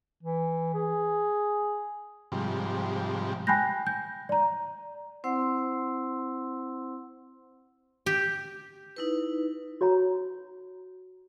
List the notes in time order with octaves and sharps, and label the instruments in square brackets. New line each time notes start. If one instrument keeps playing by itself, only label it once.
[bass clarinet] E3
G#4
[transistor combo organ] G#2 C3 F3 G3
[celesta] G5 G#5 B5 F#6 G6 A#6
G6
D5 A#5
[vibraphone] C4 E4 C5 F#5 C6 E6
[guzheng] G4
[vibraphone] D#4 E4 B4
[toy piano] F#4 C#5 A#5